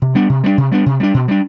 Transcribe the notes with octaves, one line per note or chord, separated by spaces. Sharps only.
C3
G3 B3 D4
C3
G3 B3 D4
C3
G3 B3 D4
C3
G3 B3 D4
B2
G3 D4